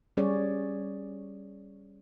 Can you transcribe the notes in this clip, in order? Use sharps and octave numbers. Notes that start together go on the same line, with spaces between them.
G3 C#4 G#4 C#5 D5